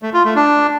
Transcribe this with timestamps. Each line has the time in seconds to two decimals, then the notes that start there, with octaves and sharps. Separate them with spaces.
0.02 A3
0.14 F4
0.25 A3
0.36 D4